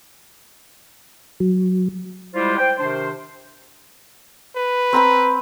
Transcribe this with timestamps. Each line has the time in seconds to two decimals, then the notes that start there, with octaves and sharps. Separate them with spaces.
1.40 F#3
2.35 G3 G#3 E4 F4 G4 C5
2.59 C5 G5
2.78 C3 D#3 D4 C5
4.56 B4
4.93 C4 A#5 B5